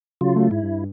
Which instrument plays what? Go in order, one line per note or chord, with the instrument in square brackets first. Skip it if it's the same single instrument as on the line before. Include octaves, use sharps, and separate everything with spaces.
[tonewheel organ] C#3 F#3 F4
[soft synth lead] A3
[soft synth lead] G#2 [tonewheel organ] E4
[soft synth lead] G2